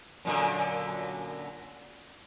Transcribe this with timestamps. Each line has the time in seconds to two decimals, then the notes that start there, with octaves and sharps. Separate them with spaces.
0.25 F#2 A#2 D3